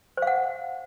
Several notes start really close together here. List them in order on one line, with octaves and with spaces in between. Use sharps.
C5 F5 F#5